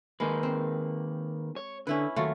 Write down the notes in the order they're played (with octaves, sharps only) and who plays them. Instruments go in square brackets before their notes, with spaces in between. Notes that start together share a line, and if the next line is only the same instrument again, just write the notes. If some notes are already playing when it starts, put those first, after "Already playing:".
[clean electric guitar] D#3 A#3 B4 [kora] G#3
[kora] C4
[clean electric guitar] C#5
[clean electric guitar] D3 [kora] C#4 E4 B4
[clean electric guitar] D#2 [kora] F#3 A3 F4